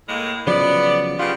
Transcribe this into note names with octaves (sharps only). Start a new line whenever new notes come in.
A2 G#3 A#3
C#3 F3 F#3 B3 D5
C#3 B3 F4 G4